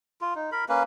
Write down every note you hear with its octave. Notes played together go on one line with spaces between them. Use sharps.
F4
D#4
A#4 B5
A#3 C#4 B4